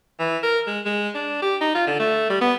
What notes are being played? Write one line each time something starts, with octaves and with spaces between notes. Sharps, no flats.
E3
A#4
G#3
G#3
D4
G4
D#4
F4
D3
A3
G3
B3